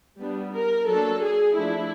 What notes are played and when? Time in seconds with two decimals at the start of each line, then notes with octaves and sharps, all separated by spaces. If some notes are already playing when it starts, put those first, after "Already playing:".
0.18 G3 B3 D4
0.53 A#4
0.88 F#3 A#3 D4 A4
1.23 G#4
1.57 F3 A3 D4 E4